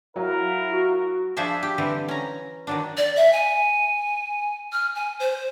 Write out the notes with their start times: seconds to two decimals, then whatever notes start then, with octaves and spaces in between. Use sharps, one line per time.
0.16 F#3 E4 A#4 F5 F#5
0.72 F#4
1.37 F3 D4 G#4 C5 E5
1.63 G4
1.78 D3 E3 G3 C4
2.08 C#4 A#5
2.67 D#3 F#3 D4
2.97 D5
3.16 E5
3.33 G#5
4.72 F6
4.95 G#5
5.20 C5